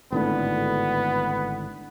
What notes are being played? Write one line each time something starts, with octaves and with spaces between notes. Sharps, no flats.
G#1 A2 D3 B3